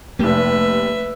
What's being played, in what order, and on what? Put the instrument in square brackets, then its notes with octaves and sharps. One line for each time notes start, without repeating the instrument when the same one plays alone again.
[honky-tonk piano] F1 G4 [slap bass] A3 A#3 [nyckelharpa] B4 E5